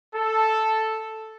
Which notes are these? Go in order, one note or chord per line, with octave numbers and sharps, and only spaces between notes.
A4